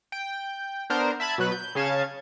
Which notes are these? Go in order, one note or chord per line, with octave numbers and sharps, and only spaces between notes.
G5
B3 D4 A#4 C5
E5 A5 B5 G#6
B2 F#3 B4 B5
G6
C#3 C#4 F5 A5 G#6